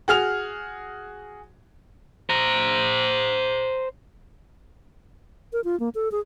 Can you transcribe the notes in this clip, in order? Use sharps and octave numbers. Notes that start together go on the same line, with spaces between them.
F#4 G#4 F6 F7
C5 A#5
A#4
F4
A#3
A4
G#4